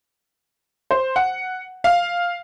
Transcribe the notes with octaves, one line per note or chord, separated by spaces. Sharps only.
C5
F#5
F5